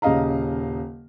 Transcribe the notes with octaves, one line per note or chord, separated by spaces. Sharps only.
D#1 C#3 D#5 F5 A#5